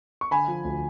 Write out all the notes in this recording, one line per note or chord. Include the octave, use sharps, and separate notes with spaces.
C#6
D3 G#5 B5
F3
D2